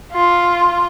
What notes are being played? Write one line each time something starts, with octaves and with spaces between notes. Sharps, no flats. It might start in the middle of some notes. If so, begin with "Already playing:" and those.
F4